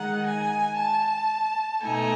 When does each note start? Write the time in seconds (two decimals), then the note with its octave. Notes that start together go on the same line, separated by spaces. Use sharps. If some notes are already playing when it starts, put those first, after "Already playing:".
Already playing: D#3 G#3 D#4 F#5
0.25 G#5
0.77 A5
1.82 B2 A3 D#4 G#5